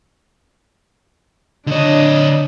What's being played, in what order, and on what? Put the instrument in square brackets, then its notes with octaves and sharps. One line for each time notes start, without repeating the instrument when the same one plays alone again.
[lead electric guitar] D3 C#5 [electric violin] D4 D#5